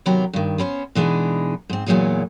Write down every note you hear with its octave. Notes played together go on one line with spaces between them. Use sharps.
C3 D#3 F#3 B3 G4 A#5
G2 D#3
B3 C#4 B4 C5
B2 E3 G#3 D4 D#4
G#2 C4
E2 A#2 D3 F#3 G#3 D#4